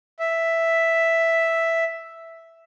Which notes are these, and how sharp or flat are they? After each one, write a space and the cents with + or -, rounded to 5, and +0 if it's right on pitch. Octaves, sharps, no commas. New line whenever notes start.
E5 +0